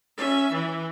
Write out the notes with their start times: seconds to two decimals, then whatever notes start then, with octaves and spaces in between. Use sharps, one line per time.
0.17 C#4 E5
0.52 E3